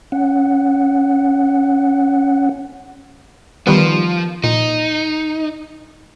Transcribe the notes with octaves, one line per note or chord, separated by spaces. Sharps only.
C#4 F#5
D#3 F3 G3 B3
A#2 D#4